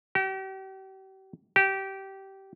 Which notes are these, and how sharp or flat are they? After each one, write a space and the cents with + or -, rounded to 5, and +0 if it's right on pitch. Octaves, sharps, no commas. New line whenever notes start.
G4 -40
G4 -20